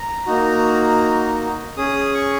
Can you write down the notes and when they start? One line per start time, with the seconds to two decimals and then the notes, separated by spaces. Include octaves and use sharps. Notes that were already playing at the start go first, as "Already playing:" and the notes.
Already playing: A#5
0.26 A#3 D#4 F#4
1.77 C#4 G#4 D#6
2.14 C#6